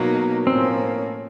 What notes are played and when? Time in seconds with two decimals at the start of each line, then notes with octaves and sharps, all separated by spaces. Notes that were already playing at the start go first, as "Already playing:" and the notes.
Already playing: B2 F#3 A#3 D#4
0.47 A2 F3 A#3 C4 C#4